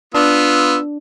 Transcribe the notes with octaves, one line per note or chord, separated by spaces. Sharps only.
B3 D4 F4 E6